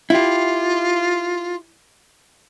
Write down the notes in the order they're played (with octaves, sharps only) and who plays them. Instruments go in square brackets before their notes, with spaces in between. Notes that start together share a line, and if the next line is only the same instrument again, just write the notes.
[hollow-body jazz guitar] E4 G4 [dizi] F4